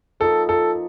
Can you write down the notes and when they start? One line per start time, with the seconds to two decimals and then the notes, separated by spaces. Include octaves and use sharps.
0.20 F3 A#3 D#4 A4
0.49 A4